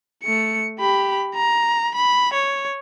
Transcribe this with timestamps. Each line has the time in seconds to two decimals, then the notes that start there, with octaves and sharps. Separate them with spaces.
0.24 A3 C#7
0.79 G4 B5
1.35 A#5
1.95 B5
2.33 C#5